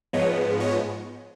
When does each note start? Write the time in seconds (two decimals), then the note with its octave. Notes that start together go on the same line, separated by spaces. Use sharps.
0.13 G#2 F3 G#3 B3 C#5 D#5
0.60 C#5 D#5